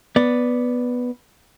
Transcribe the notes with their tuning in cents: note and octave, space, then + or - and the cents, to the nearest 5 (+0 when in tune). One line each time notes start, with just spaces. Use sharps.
B3 +0 D5 +0